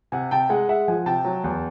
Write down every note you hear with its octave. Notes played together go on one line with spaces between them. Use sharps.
C3 F#5 G#5
C3 G5 A5
G#3 F#5 G#5
G#3 E5 F#5
F3 F#5 G#5
C3 G5 A5
F#3
E2